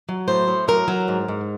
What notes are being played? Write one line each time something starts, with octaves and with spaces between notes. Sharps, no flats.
F#3
A2 C5
A2
F#3 A#4
F#3
G#2
G#2